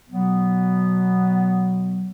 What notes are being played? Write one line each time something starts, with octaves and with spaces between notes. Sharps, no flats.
B2 F#3 B3